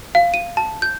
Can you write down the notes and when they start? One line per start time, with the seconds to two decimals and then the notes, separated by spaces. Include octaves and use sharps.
0.15 F5
0.34 D#7
0.57 A5
0.82 G6